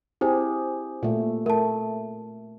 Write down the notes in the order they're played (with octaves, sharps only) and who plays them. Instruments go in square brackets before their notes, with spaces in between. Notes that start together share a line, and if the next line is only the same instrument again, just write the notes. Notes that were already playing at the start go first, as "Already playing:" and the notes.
[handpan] C4 G4 G#4 [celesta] E4 C5
[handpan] A#2 A3
[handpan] A3 [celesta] A#4 A5